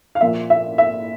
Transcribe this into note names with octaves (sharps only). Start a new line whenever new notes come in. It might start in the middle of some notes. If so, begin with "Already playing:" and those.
F5
A#2 F3 A#3 E5
E5
E5